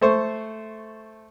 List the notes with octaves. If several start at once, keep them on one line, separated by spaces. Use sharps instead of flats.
A3 C5 C#6